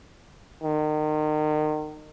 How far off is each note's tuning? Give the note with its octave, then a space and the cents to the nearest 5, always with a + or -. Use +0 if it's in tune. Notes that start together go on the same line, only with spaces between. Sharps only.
D#3 -30